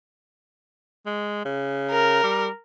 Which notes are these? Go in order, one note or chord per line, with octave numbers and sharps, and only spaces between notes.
G#3
C#3
A#4
G3